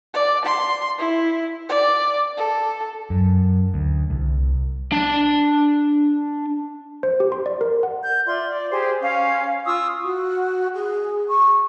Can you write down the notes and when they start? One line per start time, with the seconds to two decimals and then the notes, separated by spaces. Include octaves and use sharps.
0.14 D5
0.45 C6
0.99 E4
1.69 D5
2.37 A4
3.10 F#2
3.74 D2
4.10 C2
4.92 D4 A5
7.03 C5
7.20 G4
7.32 C6
7.46 D5
7.61 A#4
7.83 F#5
8.02 G6
8.26 F4 D5 E5 C6
8.49 D5
8.71 G4 G#4 C5
9.02 C#4 F5 G#5
9.65 F4 C#6 D#6 E6
10.04 F#4
10.73 G#4
11.28 C#6